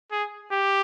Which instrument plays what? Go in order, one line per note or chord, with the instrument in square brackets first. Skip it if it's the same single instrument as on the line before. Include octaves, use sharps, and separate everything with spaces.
[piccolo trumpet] G#4
G4